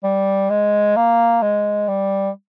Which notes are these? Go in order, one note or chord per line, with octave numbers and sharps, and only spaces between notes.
G3
G#3
A#3
G#3
G3